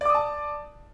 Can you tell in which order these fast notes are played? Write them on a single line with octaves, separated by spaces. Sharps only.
D5 D6 D#6 A5